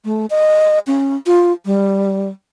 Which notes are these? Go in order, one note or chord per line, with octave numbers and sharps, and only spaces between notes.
A3
D#5
C#4
F4
G3